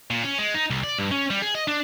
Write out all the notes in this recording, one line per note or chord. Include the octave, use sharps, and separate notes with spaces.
A#2
C#4
G#3
D#4
C2
D5
G2
C#4
G3
G#4
D#5
D4